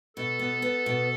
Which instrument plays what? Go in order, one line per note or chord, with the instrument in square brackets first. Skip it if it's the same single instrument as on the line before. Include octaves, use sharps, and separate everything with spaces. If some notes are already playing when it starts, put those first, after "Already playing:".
[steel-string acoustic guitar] B2 [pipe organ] A4
[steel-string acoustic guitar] B3
B3
B2